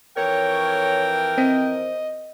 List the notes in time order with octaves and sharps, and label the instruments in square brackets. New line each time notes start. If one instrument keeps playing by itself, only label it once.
[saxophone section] F2 E3 A#4 [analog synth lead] C#5 [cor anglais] G5
[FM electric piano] C4 [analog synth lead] D#5